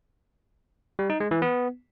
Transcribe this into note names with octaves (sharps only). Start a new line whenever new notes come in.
G3
D#4
G#3
E3
B3